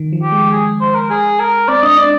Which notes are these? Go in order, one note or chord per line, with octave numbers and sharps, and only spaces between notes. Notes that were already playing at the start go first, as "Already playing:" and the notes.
Already playing: D#3
F3
G4
G#3
G#4
C5
A#4
G#4
A#4
C4 D5
D4 D#5
D4 D5